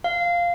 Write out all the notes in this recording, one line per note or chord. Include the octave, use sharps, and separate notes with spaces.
F5